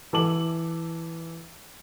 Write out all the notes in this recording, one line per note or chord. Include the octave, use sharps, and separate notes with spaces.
E3 A4 D6 F#7